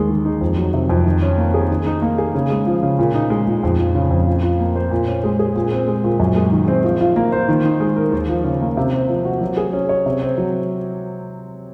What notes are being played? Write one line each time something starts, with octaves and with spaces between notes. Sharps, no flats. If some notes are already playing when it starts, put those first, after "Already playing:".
Already playing: D#2 G#3
D#3
D#4
F2
F#3
C3
F2
D#3
C#4
A#3
G#4
D#3
D#4
A#3
G#4
C#3
G#3
F3
C#3
A#2
D#4
G#3
A#2
F2
F3
C#3
F2
F3
F4
A#3
C5
A#2
C#4
G#3
G#4
A#2
C4
G#3
A#2
F#2
G#3
D#3
C4
F3
F4
A#3
C5
D#3
D#4
G#3
A#4
D#2
F3
C#3
A#3
C3
C4
F3
F#4
F#3
G#4
C#4
C#5
C3
C4
F#3